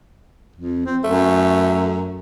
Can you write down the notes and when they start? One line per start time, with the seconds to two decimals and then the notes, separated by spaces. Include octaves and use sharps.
0.56 F2
0.86 C4
1.04 F#2 A3